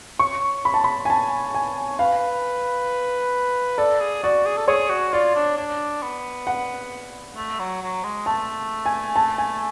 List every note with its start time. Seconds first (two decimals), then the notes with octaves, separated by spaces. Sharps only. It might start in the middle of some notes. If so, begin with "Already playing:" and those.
0.19 C#5 C#6
0.65 B5
0.74 A5
0.84 B5
1.05 G#5
1.10 A5
1.55 G#5
1.99 B4 F5
3.78 A4 D5
4.01 G#4
4.23 F#4 D5
4.46 G#4
4.57 A4
4.68 G#4 C#5
4.90 F#4
5.13 F4 D5
5.36 D4
5.58 D4
6.03 B3
6.47 F#5
7.37 A3
7.59 F#3
7.82 F#3
8.04 G#3
8.26 A3 A5
8.86 G#5
9.16 A5
9.38 G#5